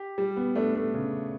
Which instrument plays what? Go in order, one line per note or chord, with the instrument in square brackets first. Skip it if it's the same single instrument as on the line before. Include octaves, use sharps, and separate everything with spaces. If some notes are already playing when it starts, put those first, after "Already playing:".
Already playing: [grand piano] G4
G3
[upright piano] B3
[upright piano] A3 [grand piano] D4
[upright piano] A3
[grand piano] C#3